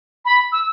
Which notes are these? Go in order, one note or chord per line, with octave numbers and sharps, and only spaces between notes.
B5
E6